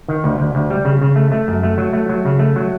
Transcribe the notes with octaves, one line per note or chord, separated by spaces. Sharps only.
D#3
D2
D2
D2
G3
C#3
C#3
A3
A3
F#2
A3
F#3
A3
F#3
C#3
A3
F#3